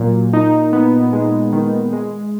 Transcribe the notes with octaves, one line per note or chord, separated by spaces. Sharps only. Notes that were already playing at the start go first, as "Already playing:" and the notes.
Already playing: A#2 F#3 A#3
D#4
B3
G#3
D#3
G#3